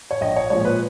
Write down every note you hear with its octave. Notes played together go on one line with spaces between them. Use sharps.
C#5
A#1 D#5
C#5
A#2 F3 G#3 C#5
B4